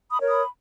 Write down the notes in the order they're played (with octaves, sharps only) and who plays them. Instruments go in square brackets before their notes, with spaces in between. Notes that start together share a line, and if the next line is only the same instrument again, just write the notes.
[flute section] B5 D#6
A#4 C#5
B5 D#6